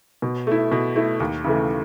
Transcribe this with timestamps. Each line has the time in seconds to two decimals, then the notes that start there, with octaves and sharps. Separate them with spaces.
0.22 B2
0.47 A3 E4
0.72 B2
0.96 A3 E4
1.20 D#2
1.45 C#3 E3 A3